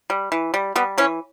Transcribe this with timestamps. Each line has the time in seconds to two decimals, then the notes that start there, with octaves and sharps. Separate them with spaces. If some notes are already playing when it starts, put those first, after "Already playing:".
0.10 G3
0.32 E3
0.54 G3
0.76 G3 B3
0.98 E3 C#4